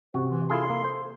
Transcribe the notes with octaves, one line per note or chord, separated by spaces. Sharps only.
C3 F#4 C5
E3 C6
E4 F4 G#4 A4 C6
A#3
C5